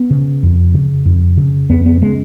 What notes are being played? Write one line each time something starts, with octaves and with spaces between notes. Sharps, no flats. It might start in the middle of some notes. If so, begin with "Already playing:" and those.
Already playing: B3
C#3
F2
C#3
F2
C#3
F2 B3
B3
C#3 G#3